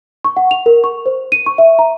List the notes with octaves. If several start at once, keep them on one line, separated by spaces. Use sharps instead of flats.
C#6
F#5
F7
A#4
C#6
C5
D#7
C#6
E5
A#5